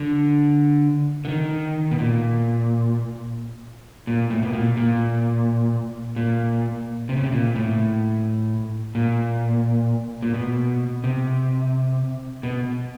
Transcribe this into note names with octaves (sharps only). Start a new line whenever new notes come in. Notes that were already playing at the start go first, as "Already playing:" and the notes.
Already playing: D3
D3
D#3
B2
A#2
A#2
A2
B2
A#2
A#2
A#2
C3
C#3
C3
A#2
A2
A#2
A#2
B2
C3
B2